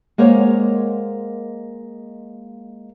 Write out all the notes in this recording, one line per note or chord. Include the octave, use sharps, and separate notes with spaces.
G#3 A#3 A#4 C5 C#5 F#5